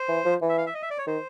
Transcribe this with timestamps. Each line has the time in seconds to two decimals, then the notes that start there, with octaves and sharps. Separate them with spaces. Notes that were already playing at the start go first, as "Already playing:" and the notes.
Already playing: C5
0.09 E3
0.25 F3
0.42 E3
0.49 E5
0.57 F5
0.66 E5
0.74 D#5
0.82 E5
0.90 D5
0.98 C#5
1.07 D#3 C5